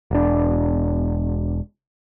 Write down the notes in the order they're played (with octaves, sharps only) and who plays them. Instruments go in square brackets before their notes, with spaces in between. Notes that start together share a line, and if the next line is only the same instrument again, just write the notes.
[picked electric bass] E1 D4